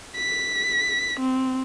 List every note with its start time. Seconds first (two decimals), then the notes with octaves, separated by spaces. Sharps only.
0.16 B6
1.20 C4